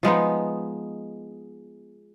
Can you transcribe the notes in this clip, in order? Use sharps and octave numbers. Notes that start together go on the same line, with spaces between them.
F3 G#3 B3 D#4